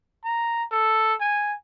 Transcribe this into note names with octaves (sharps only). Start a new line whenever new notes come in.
A#5
A4
G#5